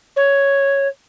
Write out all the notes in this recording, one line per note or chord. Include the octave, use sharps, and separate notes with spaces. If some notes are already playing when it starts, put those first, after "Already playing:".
C#5